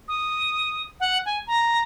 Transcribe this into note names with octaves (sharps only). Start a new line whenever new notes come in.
D#6
F#5
G#5
A#5